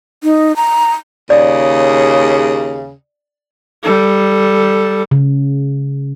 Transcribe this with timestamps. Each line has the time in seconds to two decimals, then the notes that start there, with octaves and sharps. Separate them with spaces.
0.24 D#4
0.56 A#5
1.30 D#2 C#3 D5
3.84 G3 A4
5.11 C#3